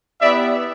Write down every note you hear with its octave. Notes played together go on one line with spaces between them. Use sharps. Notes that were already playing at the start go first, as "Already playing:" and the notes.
B3 E4 G4 D5 E5